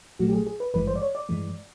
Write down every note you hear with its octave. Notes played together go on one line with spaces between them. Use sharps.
B1 A#2 F#3 A3 F#4
G4
G#4
G#4
B4
G#1 G2 E3 G#3 B4
C5
D5
C#5
D5
G2 E3 G#3